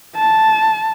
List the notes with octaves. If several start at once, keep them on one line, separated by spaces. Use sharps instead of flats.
A5